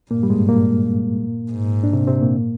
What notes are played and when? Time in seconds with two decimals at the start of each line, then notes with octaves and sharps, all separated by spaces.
0.11 G2 A#2 A#3
0.23 G3
0.30 G#2 G#3
0.49 A#2 A#3
1.51 G#2
1.83 D4
1.93 C3 C4
2.07 C3 C4
2.21 A#2 A#3